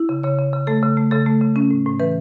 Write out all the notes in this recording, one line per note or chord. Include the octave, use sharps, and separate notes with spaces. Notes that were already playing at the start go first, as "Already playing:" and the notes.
Already playing: E4
C#3
C#3 C#5
C#3
C#3
A3 A4
C#3
A3
C#3 A4
A3
C#3
C#4
A2
A2
E3 B4